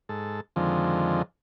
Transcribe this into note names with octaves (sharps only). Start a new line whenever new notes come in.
G#2 A4
F2 D3 D#3 F3 G#3 C4